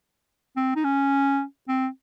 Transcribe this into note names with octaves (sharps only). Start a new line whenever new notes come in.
C4
D#4
C#4
C4